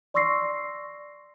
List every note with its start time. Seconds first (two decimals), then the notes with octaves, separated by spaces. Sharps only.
0.14 D5 C6 C#6 E6 A#6 C7